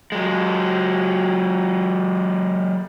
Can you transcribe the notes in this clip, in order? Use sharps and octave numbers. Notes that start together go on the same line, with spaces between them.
F#3 G#3